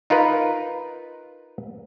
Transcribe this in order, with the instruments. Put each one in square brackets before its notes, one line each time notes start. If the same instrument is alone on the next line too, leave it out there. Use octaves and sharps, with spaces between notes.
[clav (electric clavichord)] D#4 F4 A#4 B4